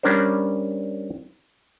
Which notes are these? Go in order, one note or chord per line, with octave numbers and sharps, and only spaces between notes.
G3 C#4 D4 A#4 C5